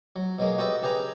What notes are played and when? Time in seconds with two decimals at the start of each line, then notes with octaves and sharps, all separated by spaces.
0.16 F#3
0.39 B2 F#3 G#3 A#3
0.58 F#4 G4 A4 B4 D#5 E5
0.82 C#3 G4 G#4 B4 A#5